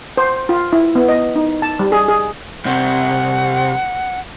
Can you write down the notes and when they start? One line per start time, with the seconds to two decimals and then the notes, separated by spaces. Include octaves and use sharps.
0.17 C5
0.49 F4
0.73 E4
0.95 B3
1.09 D#5
1.36 D#4
1.62 A5
1.79 G3
1.92 G#4
2.08 G#4
2.65 C2 C3 F#5